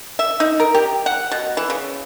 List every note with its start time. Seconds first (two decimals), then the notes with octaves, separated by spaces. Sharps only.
0.19 E5
0.40 D#4
0.60 A#4
0.75 G4
1.06 F#5
1.31 B2
1.57 E3
1.70 C#3